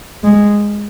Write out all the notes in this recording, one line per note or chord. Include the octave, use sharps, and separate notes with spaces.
G#3